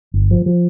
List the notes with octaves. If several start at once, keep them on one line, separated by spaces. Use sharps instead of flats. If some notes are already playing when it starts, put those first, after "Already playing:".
G1
F3
F3